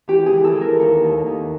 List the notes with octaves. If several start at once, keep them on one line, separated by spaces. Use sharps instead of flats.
E3 G4
G#4
E3
A4
E3 A#4
D#2 A4
D#2
D#2